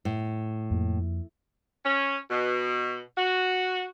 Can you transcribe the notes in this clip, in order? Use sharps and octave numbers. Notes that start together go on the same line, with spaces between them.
A2
F2 A#3
C#4
B2
F#4